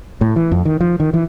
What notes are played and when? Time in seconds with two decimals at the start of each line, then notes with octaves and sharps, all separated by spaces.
0.21 A2
0.36 E3
0.52 F2
0.65 D#3
0.81 F3
1.00 D#3
1.14 E3